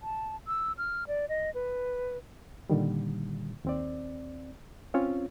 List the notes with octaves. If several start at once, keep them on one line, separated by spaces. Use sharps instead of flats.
A5
E6
F6
D5
D#5
B4
A#2 D3 D#3 G3
D#2 C4 D5
C4 C#4 F4 C#5